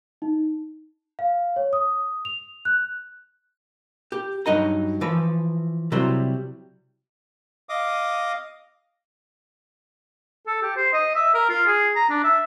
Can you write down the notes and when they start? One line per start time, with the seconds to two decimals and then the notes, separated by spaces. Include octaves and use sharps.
0.22 D#4
1.19 F5
1.56 C#5
1.73 D#6
2.25 F7
2.65 F#6
4.12 G4
4.46 G2 F#3 D#4 D#5 A#5
5.01 E3 F3 B4
5.92 C3 F#3 G3 E4 C5
7.69 D#5 F5 D6 D#6
10.47 A4
10.62 G4
10.77 C5
10.93 D#5
11.15 E5
11.34 A#4
11.49 F4
11.66 G#4
11.95 A#5
12.10 D4
12.24 E5